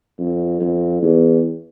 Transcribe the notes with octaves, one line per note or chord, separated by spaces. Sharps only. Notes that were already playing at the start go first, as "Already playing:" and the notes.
F2
F2
E2